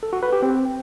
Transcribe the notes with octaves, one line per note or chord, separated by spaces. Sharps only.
A4
F#4
B4
G4
C4